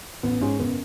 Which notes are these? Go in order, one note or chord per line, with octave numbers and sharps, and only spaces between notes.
A1 B3
G#2 G#3 C#4
F#1 B3